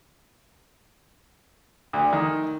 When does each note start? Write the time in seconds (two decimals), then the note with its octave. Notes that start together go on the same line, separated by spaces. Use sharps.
1.93 D2
2.13 D#3